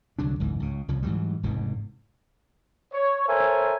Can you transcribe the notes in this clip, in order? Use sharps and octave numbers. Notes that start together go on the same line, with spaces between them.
C2 D3 F#3 D4
F#1 C#2 G#2 E3
C#2 C#3
C2 C#3 F3
G#2 E3 F#3 G3
F1 E2 G#2 B2
C#5
A4 A#4 C5 C#5 E5 G#5